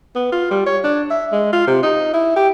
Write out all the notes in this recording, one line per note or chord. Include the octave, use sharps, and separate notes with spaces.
B3
F4
G3
C#5
D4
E5
G#3
F4
C3
D#4
E4
G4